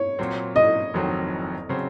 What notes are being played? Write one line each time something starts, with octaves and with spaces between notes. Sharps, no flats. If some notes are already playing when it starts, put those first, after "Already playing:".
Already playing: C#5
A#2 F#3 C4
D#5
F1 F2 D#3 F#3 C4
C#3 F#3 C4